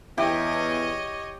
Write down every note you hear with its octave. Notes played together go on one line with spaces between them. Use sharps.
E2 E4 G4 C#5 D#5